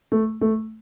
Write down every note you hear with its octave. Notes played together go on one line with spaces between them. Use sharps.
A3
A3